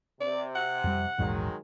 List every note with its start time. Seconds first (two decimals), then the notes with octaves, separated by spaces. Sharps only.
0.21 C3 D5
0.55 F#5
0.84 F2 G3
1.19 A#1 E2 G#2 D#3 F#3 G#3